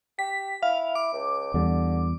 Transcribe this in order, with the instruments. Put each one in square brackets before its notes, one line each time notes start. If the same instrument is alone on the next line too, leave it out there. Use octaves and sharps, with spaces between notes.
[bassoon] G4 [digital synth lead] B6
[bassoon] E4 [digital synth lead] F5
[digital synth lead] D6
[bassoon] C#2
[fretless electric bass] E2 G3 [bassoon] D3